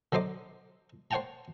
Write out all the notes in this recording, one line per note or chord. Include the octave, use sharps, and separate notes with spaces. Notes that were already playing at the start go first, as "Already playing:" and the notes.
D3 F#3 C5 D#5 D6
C5 C#5 F#5 G5 A5 A#5